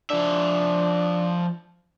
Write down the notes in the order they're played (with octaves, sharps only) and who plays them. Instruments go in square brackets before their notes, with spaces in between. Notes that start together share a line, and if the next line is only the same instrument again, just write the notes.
[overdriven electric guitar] F3 E5 [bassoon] D4